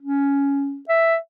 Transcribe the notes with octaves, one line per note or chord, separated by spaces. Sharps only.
C#4
E5